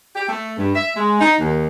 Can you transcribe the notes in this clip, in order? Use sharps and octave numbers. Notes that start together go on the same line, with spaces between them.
G4
A3
G2
E5
G#3
D#4
D#2